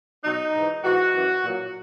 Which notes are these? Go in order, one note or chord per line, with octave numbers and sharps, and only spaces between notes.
B2 F#3 D#4
G#2 E3
G#2 E3 F#4
F#2 E3
A#2 F#3